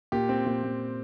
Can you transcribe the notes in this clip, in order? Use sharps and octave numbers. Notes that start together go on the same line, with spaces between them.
A#2 G4
C4
A#2
A#2